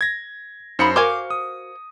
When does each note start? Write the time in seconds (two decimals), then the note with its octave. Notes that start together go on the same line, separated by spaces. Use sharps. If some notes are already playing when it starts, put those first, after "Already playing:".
0.01 G#6 A#6
0.79 F#2 D#4 C5 F5 B5 C#7
0.96 F#4 A#4 C5 F5 G#5 D6
1.30 D#6